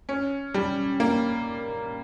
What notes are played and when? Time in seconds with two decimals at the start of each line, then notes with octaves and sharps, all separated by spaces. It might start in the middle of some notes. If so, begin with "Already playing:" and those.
0.09 C#4
0.54 G3
1.00 A#3